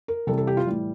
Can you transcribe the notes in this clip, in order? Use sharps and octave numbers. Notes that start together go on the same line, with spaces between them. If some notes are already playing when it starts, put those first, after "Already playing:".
A#4
C3 E3 G3 A4
A4
G4
F4
A2 E3 G3